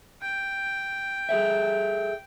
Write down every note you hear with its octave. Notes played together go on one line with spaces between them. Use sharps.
G5
G#4 A4 E5